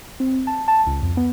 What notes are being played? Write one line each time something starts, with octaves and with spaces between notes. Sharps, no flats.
C4
A5
A5
C#2
F2
B3